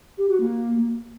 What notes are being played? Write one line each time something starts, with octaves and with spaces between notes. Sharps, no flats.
G4
F#4
A#3